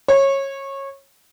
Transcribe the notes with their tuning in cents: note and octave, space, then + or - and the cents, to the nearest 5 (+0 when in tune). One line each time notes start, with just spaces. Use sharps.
C#5 -20